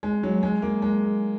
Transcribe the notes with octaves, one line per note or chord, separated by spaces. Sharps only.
G#3
F#3
G#3
A#3
G#3